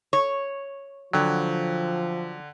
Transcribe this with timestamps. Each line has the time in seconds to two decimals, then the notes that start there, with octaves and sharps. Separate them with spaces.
0.13 C#5
1.13 D3 F3 F#3 G5